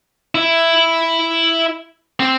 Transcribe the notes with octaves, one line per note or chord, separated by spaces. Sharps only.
E4
C4